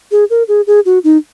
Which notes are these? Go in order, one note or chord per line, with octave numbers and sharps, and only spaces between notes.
G#4
A#4
G#4
G#4
F#4
D#4